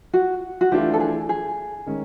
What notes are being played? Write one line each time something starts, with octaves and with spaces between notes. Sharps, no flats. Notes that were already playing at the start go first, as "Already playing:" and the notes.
F#4
F#4
E3 A3 D4 F4 G4
A4
G#4
G#4
D#3 G#3 C#4